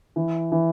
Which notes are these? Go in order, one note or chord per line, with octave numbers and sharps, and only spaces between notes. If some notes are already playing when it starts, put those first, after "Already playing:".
E3
E3